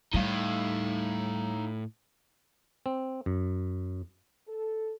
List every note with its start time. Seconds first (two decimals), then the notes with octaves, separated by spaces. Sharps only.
0.14 A2 G3 D#4 F5
2.86 C4
3.26 F#2
4.48 A4